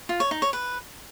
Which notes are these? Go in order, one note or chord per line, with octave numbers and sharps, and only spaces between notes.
F4
C#5
D#4
C#5
B4